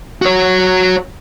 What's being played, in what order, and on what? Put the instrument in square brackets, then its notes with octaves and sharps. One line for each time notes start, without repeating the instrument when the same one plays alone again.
[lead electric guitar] F#4 C#5